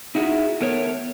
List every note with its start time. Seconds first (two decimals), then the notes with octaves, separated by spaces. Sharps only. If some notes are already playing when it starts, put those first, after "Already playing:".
0.15 D#4 E4 F#4 G#4 E5
0.61 A3 B3 A#4 C#5